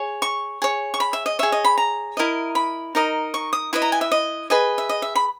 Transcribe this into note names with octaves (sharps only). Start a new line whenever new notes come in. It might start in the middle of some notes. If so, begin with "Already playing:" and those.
Already playing: G#4 C#5
C#6
G#4 C#5
C#6
B5
E5
D#5
G#4 C#5 E5
D#5
B5
A#5
E4 A#4 D#5
B5
D#4 A#4 D#5
C#6
D#6
E4 B4 D#5
A#5
G#5
E5
D#5
G#4 B4 D#5
E5
D#5
E5
B5